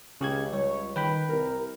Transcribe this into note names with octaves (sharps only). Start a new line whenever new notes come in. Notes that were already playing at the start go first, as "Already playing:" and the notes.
C#2 C#3 G4 G#6
G3 C#5
D#3 B4 G5 B5
C2 A#4